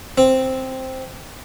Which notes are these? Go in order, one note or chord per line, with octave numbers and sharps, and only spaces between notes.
C4